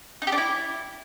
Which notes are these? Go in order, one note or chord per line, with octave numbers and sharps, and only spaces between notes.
D#4
G4
D4
E4